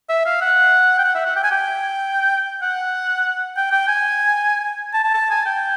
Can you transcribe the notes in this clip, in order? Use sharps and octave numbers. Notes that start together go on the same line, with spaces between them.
E5
F5
F#5
G5
F#5
E5
F#5
G5
G#5
G5
F#5
G5
G5
G#5
A5
A5
A5
G#5
G5